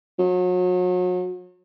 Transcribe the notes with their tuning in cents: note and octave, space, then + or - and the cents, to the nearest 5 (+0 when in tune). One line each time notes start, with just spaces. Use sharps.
F#3 -35